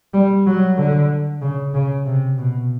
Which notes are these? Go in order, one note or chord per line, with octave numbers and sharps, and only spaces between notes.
G3
F#3
D3
C#3
C#3
C3
B2